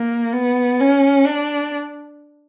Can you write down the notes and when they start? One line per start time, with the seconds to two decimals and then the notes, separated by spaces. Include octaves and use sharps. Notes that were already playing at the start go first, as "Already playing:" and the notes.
Already playing: A#3
0.34 B3
0.80 C#4
1.26 D4